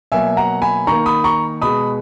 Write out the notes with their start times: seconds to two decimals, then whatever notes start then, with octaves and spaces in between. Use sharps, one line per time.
0.12 B2 F#3 A#3 E5 G#5
0.37 F#5 A#5
0.62 G#5 B5
0.87 D#3 A#3 A#5 C#6
1.06 B5 D#6
1.24 A#5 C#6
1.62 B2 G#3 B5 D#6